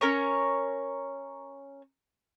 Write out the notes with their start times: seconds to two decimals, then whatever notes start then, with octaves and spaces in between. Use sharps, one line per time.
0.01 C#4 A#4 C#5